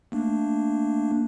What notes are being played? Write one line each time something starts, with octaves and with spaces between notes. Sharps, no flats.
A3 A#3 D4